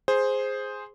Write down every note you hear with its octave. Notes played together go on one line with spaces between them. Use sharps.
G#4 C5